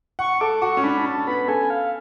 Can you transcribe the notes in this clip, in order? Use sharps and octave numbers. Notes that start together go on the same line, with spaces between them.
F#5 C#6
A4 D6
F#4 C#6
C#4
D4 B5
D4
C#4 A5
B3 B5
A4 G#5
F5